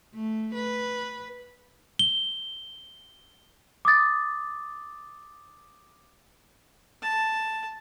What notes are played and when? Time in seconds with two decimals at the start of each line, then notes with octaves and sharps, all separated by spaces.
0.14 A3
0.54 B4
1.99 G7
3.85 D6 D#6 A6
7.02 A5